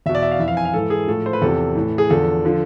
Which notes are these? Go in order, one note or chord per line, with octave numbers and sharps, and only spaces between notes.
E2 B2 E5
D5
E5
F5
F2 E3 E5 F5
G#5
F5
G#2 E3 A4
G#4
A2 F3 A4
C5
B4
E2 C3 F3 A4
A2 E3
G#4
E2 D3 F3 A4
D3 F3